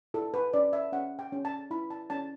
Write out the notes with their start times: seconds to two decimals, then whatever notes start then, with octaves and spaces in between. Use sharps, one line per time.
0.14 E4 A4
0.34 B4
0.53 C#4 D5
0.73 E5
0.92 C#4 F#5
1.19 G5
1.32 C#4
1.45 A5
1.71 E4 B5
1.90 A5
2.10 C#4 A5